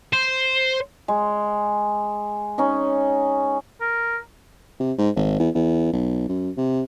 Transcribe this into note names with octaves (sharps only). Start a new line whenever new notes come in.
C5
G#3
C#4 D#4
A#4
C3
G#2
G#1
E2
E2
B1
F#2
C3